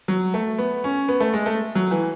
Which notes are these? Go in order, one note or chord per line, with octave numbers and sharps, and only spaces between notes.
F#3
A3
B3
C#4
B3
A3
G#3
A3
F#3
E3